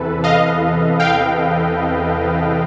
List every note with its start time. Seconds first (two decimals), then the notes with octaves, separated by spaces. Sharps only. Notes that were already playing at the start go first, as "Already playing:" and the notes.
Already playing: E2 C3 E3 A4 B4
0.24 D#5 F5
1.00 F5 G5